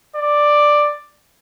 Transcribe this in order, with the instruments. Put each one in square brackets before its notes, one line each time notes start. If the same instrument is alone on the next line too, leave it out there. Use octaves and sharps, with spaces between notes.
[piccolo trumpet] D5